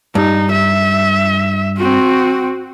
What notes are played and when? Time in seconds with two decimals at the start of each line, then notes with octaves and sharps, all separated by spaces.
0.15 G2 D#4
0.51 E5
1.78 C4 F#4